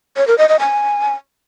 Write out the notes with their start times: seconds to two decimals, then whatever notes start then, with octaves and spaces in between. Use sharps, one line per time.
0.17 C#5
0.27 A#4
0.38 D#5
0.49 D#5
0.60 G#5